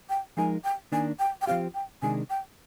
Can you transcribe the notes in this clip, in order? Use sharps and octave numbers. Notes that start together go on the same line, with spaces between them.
G5
F3 G#3 D#4 A#4 G#5
G5
D#3 A#3 D4 G#5
G5
G5
F3 C4 G4 F5
G5
C3 D#3 G#3 D4 G#5
G5